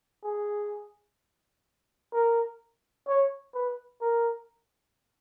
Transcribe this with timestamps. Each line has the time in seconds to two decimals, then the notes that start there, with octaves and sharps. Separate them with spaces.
0.24 G#4
2.13 A#4
3.07 C#5
3.55 B4
4.01 A#4